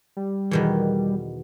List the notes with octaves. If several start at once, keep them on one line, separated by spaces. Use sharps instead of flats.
G3
E2 B2 D#3